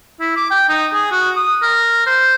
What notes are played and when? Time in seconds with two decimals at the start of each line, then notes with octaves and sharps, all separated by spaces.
0.20 E4
0.37 D6
0.51 G5
0.69 D#4
0.93 G#4
1.11 F#4
1.36 D#6
1.62 A#4
2.07 C5